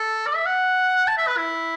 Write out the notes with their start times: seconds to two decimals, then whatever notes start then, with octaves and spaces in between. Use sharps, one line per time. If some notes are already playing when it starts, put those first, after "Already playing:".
Already playing: A4
0.26 D5
0.35 E5
0.46 F#5
1.07 A5
1.17 E5
1.27 B4
1.37 E4